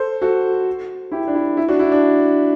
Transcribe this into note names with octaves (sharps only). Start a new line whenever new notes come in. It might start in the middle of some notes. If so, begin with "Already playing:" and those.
Already playing: A4 C5
F#4 A4
E4 G4
D4
E4
E4
D4 F#4
E4
D4